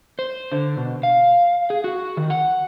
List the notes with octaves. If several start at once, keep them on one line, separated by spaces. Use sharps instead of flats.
C5
D3
B2
F5
G#4
F#4
D#3
F#5